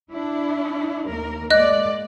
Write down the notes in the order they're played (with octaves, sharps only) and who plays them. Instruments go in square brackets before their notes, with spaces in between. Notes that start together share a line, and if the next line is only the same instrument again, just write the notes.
[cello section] D4 E4
D#2 A#3 A#4
[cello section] G#3 A#3 D5 [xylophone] D#5 F#6